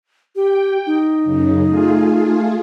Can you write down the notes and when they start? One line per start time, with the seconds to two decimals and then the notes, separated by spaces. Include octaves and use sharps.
0.36 G4 G5
0.86 D#4
1.24 F#2 C#3
1.66 A3 F4 G#4